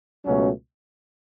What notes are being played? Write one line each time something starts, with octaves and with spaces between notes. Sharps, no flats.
C#2 B2 F#3 A3 C#4